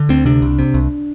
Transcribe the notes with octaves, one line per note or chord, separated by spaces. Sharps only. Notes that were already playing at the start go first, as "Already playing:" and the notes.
Already playing: D3
D2 C4
C3 D4
C2
C3
C2